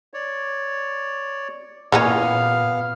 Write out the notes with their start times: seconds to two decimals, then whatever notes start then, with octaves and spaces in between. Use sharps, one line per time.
0.14 C#5 D5
1.92 A#2 E3 A#3 B3 C#4 F5 F6